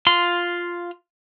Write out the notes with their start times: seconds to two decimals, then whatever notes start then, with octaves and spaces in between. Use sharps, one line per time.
0.07 F4 C6